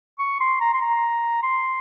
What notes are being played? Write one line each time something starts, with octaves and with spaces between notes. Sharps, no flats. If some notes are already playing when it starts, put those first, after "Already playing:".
C#6
C6
A#5
C6
A#5
C6